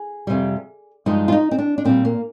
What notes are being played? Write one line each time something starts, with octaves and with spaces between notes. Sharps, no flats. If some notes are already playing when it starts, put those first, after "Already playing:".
Already playing: G#4
F2 C3 G3
G2 F3 G#3 D#4
F4
D#4
C4
D4
D4
A#2 G3 C4
A#3